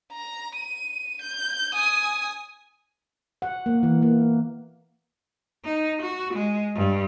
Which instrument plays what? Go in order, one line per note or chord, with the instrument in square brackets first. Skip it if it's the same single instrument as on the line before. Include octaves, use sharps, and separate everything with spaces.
[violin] A#5
D#7
G6
G#5 D#6
[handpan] F#5
A#3
E3
A#3
[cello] D#4
F#4
G#3
G2